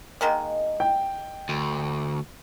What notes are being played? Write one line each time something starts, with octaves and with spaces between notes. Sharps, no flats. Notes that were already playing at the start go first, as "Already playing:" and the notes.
D#3 G#3 A#3
G5
D2